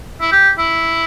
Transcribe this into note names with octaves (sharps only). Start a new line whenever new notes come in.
E4
G4
E4